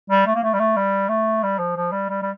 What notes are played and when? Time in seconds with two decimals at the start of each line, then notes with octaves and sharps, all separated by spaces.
0.10 G3
0.27 A3
0.35 A#3
0.43 A3
0.53 G3
0.59 A3
0.76 G3
1.09 A3
1.43 G3
1.58 F3
1.76 F3
1.92 G3
2.09 G3
2.22 G3